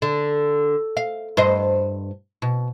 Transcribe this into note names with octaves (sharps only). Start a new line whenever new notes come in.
D3
F5
G2 C5 D#5
B2